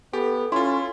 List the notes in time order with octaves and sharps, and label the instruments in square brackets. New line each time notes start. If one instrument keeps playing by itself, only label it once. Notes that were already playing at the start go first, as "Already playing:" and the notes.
[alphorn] B3 [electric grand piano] G4 [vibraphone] A4 [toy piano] G#5
[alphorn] C#4 [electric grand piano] E4 F4 [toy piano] C6